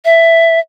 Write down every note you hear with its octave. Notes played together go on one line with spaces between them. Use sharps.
E5